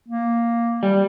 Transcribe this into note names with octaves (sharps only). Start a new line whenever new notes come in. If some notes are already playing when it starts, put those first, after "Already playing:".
A#3
G3